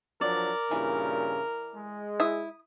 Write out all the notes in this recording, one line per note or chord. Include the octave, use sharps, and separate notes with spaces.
F3 F#3 D4 A#4 D5
G2 A#2 C#3 E3
G#3
E4 D#6